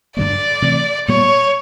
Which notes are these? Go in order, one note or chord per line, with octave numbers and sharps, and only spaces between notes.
G2 D3 F#3 A#3 D5
C3 E3 A3
A#2 G3 B3 C#5